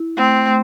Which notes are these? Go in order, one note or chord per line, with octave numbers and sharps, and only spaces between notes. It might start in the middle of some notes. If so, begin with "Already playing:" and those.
Already playing: E4
A3 C4
A3